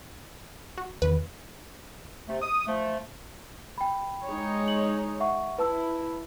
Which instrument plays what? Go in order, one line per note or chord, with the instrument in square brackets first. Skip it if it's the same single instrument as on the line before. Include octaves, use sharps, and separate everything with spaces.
[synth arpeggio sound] F#4
[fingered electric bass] E2 D#3 [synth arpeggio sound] B4
[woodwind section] C3 A3
D#6
F3 A3
[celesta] G5 B5
[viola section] G#3 D#4 C#5
[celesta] F#7
E5 F#5 C#6
[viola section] E4 [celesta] B4 A5 E6